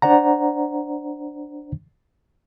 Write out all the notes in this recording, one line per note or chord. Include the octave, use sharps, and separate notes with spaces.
D4 C5 D5 F#5 A#5